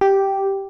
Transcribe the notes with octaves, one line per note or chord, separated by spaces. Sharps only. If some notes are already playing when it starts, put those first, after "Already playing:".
G4